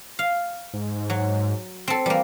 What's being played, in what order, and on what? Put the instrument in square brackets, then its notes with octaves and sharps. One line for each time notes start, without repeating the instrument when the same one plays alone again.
[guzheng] F5
[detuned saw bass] G#2
[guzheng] F#3
C4 A4
[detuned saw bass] E3 [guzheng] G3 A#3